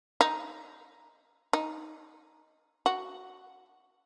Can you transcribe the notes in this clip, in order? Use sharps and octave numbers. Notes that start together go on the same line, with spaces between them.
D#4
D#4
F#4